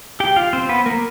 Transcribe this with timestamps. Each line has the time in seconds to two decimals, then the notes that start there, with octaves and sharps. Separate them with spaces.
0.20 G4 G5
0.36 F4 F5
0.53 C4 C5
0.69 B3 B4
0.86 A#3 A#4